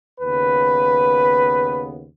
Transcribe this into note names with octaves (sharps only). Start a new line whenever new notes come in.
D#2 C#3 B3 B4